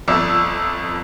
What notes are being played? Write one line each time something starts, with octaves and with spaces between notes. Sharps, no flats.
G1 F2 D5 E6